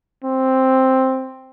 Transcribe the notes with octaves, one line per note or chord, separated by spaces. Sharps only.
C4